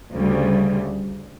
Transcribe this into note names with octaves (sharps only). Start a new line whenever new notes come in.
D2 C#3 G3